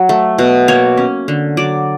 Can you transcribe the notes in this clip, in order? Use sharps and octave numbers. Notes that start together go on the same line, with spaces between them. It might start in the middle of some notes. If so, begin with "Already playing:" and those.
Already playing: F#3
A3
B2
A#3 C#5
C#4
D3
F#3 D5